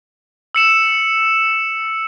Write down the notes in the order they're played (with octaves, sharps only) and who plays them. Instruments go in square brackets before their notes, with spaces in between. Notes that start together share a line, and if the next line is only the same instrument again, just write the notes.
[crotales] E6 C#7 E7